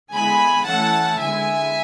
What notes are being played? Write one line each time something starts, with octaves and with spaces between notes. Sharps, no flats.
D3 G#3 B3 E4 G#5 B5
E3 A3 C#4 E4 F#5 A5
D3 G#3 B3 E4 E5 G#5